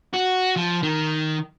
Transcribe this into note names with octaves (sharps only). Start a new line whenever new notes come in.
F#4
F3
D#3